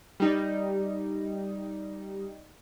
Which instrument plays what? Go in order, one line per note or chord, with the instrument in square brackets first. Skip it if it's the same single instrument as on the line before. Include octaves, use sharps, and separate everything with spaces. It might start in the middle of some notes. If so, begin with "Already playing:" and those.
[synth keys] G3 D#4